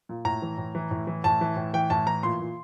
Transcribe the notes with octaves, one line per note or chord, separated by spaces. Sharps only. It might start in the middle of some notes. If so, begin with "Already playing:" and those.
A#2
A2 A#5
E3
A2
E3
A2
E3
A2 A5
E3
A2
E3 G5
A2 A5
E3 A#5
A#2 C6
A#2